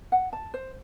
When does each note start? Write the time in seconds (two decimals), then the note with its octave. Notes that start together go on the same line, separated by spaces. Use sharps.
0.12 F#5
0.33 A5
0.54 C5